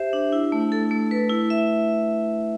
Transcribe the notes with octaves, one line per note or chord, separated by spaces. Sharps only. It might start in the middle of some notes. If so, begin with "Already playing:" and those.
Already playing: G4 C5 E5
D4
E4
A3
A4
A3
B4
E4
E5